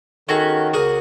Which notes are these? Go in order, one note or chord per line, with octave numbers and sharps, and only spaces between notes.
D#3 C#4 F#4 G#4 A4
C#2 F#4 G#4 A#4